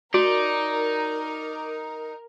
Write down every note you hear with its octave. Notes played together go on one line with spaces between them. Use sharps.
D#4 F#4 A#4 D5